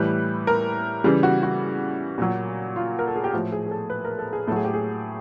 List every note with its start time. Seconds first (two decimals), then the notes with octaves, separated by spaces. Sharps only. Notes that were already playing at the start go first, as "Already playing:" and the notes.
Already playing: A2 E3 G3 B4
0.47 A#4
1.04 C#3 E3 G3 G#4
1.23 F#4
1.43 F#4
2.18 A#2 F#3
2.76 F4
2.99 A#4
3.07 A4
3.16 G#4
3.24 G4
3.33 A2 F3 F#4
3.52 G#4
3.66 G#4
3.71 A4
3.90 B4
4.05 A#4
4.19 A4
4.33 G#4
4.47 A2 A4
4.52 F#3 G#4
4.65 G4
4.74 G#4